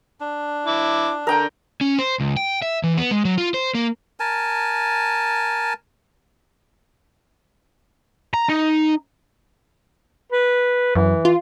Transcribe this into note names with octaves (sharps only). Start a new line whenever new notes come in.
D4
E4 D6
D3 A#4 G5
C#4
C5
C#2
G5
E5
E3
B3
G#3
F#3
F4
C5
A#3
A#4 G#5 A5
A#5
D#4
B4
F#2 E3
F4